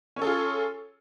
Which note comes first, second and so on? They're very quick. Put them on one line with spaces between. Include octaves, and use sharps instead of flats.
C#4 C#5 A4 G#4 F4